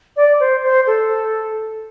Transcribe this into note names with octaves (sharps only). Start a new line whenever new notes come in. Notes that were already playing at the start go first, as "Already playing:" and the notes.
D5
C5
C5
A4